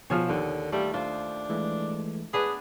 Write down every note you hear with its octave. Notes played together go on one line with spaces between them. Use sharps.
B2 F3 G#4 C#5 F6
D#2 D3
G3 A3 F4
D4 F4 C5
E3 G#3 A3
B3 D4 G#4 B4 B5